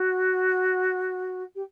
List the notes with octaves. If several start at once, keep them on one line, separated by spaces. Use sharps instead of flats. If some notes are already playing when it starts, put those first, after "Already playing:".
Already playing: F#4
G4